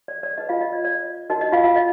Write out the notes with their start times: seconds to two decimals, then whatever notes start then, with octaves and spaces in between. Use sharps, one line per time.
0.08 D5
0.23 D5
0.38 D#4 G#4 B4 D#5
0.49 F4 F5
0.61 D#5
0.73 D5
0.84 D5
1.30 D#4 F#4 A#4 D#5
1.41 D#5
1.52 F4 F5
1.64 F4 F5
1.76 D#5